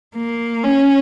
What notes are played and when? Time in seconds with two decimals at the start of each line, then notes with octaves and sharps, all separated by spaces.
0.17 A#3
0.63 C#4